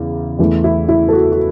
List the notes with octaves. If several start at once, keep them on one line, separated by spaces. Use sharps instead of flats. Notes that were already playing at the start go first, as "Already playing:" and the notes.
Already playing: E2 C#3
E2 E3 A3
E4
E4
A4
F#4
F#4